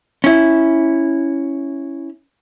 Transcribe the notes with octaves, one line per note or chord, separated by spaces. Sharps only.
C#4 E4